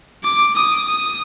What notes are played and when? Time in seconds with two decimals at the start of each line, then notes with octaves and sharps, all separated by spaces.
0.23 D6
0.56 D#6
0.88 D#6